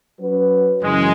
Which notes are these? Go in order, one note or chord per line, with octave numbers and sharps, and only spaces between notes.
F#3 C#4 F#4 B4
F#2 C#3 E3 G#3